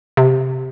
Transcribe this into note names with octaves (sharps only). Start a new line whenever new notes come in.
C3